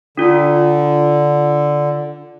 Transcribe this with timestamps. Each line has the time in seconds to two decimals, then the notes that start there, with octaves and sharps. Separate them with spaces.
0.17 D3 D4 F4